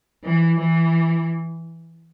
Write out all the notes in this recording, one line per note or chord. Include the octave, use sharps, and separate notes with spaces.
E3
E3